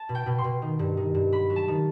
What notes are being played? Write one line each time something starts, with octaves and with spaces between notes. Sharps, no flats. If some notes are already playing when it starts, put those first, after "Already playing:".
Already playing: A5
B2
G5
B2
C6
B2
D#3
G2
D#3
G2
F#3 B5
F#3
A5
D#3